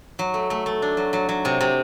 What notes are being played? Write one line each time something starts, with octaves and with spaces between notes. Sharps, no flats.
F#3
A3
A3
A3
D4
F#3
F#3
F#3
C3
C3